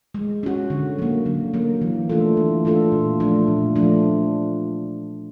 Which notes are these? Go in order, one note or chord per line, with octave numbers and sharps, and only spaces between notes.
G#3
C#4 F#4
D3
F#3 A#3
D3
F#3 A#3
E3
A3 D4 F4 A4
E3
A3 D4 F4 A4
A#2
F3 A3 D4 F4
A#2
F3 A3 D4 F4